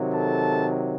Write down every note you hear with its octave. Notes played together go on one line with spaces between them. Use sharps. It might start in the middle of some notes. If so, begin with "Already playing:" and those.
Already playing: C3 D#3 F#3
A4 A5